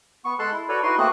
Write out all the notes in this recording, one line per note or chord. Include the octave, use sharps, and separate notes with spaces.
B3 C#6
G#3 A4 A5 C6 F#6
E4
F#4 A4 B4 C#5 D5
D#4 E4 F#4 B4 C6
A3 A#3 C4 F#4 G#4 F#6